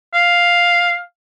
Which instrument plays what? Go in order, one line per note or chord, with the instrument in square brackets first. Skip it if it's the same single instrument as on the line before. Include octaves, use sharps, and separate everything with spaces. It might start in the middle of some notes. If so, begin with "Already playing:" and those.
[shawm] F5